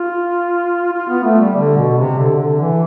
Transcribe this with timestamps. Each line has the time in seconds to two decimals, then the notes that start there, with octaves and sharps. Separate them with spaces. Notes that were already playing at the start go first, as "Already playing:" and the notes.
Already playing: F4
0.93 F4
1.09 B3
1.24 A3
1.40 G3
1.56 D3
1.77 B2
1.98 C3
2.18 D3
2.38 D3
2.59 E3